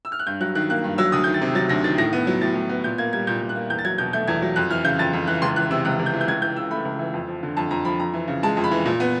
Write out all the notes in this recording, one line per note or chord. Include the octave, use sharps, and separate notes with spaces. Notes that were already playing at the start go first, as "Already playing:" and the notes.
E6
F6
F#6
G2 G6
F#3 F#6
D#3 F#6
A#3 F#6
G2
F#3 E6
D2 D#6
G6
D#3
A6
C3
F#3 A6
D2 A#6
D#3 A6
A2 A#6
B3
F#3
A2 A6
A2
B3
A#2 G6
A#3 G#6
G3 G#6
A#2 G6
A#2
F#6
A#3
E2 G6
A6
F#3 G#6
B2 G6
A3 G6
E2 G#6
F#3
F2 F#6
E3 F6
C#3 G6
F2 A6
F2
E3 F#6
C#2 C6
E3 F#6
C3 E6
C#2 F#6
C#2
G6
E3
G6
C#2 G#6
E3 G6
C#3 E6
A3 B5
C#2
E3
F2
F3
D3
F2 A5
F2 A#5
F3 B5
F2 A#5
E3
C#3
G#3 A5
F2
B5
E3
A#2
B3